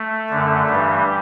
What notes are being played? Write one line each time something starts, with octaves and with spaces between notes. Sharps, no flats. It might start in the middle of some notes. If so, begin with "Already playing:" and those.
Already playing: A3
F#2 D3
G2 G3
E3